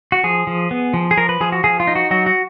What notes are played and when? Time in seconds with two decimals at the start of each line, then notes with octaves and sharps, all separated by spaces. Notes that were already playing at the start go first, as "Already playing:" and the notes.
0.12 F#4
0.24 F3 G#4
0.47 F3
0.71 B3
0.94 F3
1.11 G#4
1.17 F3 A#4
1.29 B4
1.41 F3 G#4
1.52 F#4
1.64 F3 G#4
1.80 F4
1.87 D#4
1.95 F#4
2.11 F#3 F#4
2.26 F#4